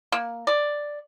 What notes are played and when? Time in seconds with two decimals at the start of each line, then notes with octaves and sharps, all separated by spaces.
0.12 A#3
0.47 D5